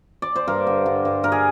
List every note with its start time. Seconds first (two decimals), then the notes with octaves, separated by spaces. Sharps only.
0.22 D5
0.36 C5
0.48 G2 A#4
0.67 D3
0.86 G2
1.05 G2
1.23 G2 A#4
1.32 G#4